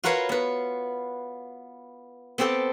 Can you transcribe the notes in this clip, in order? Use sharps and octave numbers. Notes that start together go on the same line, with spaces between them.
F4 F#4 A#4 B4 C#5 F5
B3 B4
B3 C4 G4 A4 G5